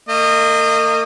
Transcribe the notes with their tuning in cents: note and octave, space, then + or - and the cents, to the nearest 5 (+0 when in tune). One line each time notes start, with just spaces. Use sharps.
A#3 -40 D#5 -20